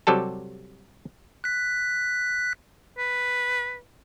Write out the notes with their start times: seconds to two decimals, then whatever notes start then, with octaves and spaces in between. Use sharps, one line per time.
0.07 C3 F#3 G3 A4 A5
1.44 F#6 B6
2.98 B4